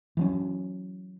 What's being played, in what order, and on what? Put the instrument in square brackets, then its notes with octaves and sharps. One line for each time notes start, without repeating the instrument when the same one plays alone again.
[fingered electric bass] E3 F#3 C#4